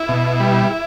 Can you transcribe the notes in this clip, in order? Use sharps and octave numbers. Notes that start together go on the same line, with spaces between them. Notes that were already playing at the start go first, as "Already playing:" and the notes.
Already playing: E4
B2
G3